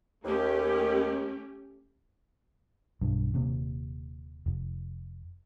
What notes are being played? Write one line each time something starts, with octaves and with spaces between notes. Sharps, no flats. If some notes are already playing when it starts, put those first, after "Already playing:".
D#2 A3 C#4 G4
B1 G2
D#1 D#2 C3
F1